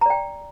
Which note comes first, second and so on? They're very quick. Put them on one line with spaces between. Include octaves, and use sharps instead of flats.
A#5 D5 G5